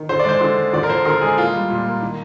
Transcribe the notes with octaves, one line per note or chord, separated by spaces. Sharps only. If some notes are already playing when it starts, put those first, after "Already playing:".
Already playing: D#3
D3 C5
D5
G#3 C5
D3
G#3
D3 D5
A#4
F3 C5
D3 A#4
G#3 G#4
A#3 F4
G3
A#2
A#3
D#3